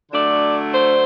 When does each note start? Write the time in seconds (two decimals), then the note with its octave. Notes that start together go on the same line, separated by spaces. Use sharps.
0.12 D3 F#3 A3 D4 D5
0.73 C5